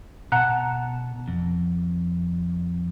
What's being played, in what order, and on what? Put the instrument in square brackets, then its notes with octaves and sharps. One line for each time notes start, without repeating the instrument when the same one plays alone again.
[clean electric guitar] B2 A5 [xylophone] F#5 A#5 F#6
[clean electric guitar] F2